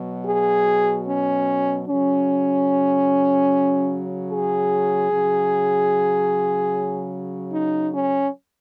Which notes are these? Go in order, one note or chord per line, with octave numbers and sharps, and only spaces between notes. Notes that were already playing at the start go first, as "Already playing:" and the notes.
Already playing: B2 F#3
G#4
C#4
C#3 F#3 C#4
G#4
C#3 F#3
D#4
C#4